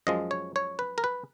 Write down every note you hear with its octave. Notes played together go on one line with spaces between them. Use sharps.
F#2 F3 G#3 D#5
C#5
C#5
B4
A#4
B4